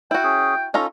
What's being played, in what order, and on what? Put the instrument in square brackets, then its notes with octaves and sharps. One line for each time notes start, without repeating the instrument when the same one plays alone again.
[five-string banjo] E4 F#4 [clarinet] G5
[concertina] C#4 G#4
[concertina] C#4 A4 [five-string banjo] D#4 F4 A#5